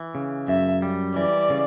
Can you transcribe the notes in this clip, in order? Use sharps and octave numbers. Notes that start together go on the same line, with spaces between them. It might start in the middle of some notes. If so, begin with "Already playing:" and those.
Already playing: E3
C#3
F#2 E5
G3
E3 D5
C#3